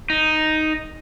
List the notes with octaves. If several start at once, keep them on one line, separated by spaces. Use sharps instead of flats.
D#4